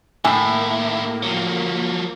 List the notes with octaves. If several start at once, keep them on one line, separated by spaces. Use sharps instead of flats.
D#2 A2 A#3 E4 G#5
F3 F#3